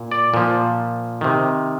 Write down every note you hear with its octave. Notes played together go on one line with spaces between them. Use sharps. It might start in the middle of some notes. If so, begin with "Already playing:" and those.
Already playing: A#2
D5
A#2 F3
C3 D#3